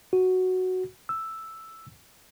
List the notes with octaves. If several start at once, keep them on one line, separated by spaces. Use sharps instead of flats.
F#4
E6